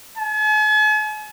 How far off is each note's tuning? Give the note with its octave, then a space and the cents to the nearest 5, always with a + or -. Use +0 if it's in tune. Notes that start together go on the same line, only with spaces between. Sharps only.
G#5 +45